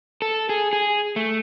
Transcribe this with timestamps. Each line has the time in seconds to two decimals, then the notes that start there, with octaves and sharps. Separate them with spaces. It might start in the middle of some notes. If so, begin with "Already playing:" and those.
0.22 A4
0.49 G#4
0.73 G#4
1.16 A3